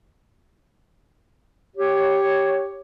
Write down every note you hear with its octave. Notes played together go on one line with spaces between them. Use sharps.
G4 C#5